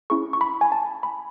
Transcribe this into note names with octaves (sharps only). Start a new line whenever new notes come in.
C#4 E4 G#4 C#6
C#6
B5
G#5
A5
B5